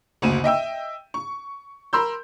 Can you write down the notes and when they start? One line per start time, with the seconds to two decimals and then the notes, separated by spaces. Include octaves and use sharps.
0.22 F#1 D2 D#7
0.44 D#5 E5 G5 E6
1.14 C#6
1.93 A#4 B5 C6 E6 G6